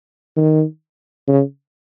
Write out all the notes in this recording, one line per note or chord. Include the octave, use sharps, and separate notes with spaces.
D#3
C#3